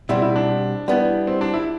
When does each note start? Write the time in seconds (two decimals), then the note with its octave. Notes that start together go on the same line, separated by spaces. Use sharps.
0.09 B2 G3 C4 E4
0.22 E4
0.36 D4
0.88 G3 B3 E4
1.27 C4
1.41 D4
1.54 E4